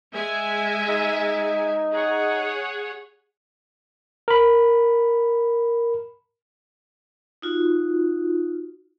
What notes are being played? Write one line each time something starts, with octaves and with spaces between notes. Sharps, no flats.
G#3 E5 G#5
D#4
G#4 C#5 F#5
A#4 B5
D#4 F4 F#4